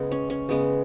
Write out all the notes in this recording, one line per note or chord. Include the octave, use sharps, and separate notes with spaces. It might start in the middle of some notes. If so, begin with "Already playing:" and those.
Already playing: C#3 G#3 B3
C#4
C#4
C#3 G#3 B3